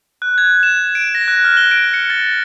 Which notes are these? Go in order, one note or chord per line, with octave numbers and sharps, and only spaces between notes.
F#6
G#6
E7
D7
A#6
F#6
F6
G7
D7
C#7
A6